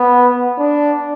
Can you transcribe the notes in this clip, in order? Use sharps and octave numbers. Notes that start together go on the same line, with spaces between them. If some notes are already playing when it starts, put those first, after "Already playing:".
Already playing: B3
D4